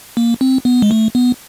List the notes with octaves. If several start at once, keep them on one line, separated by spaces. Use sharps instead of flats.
A#3
C4
B3
G#3
A3
B3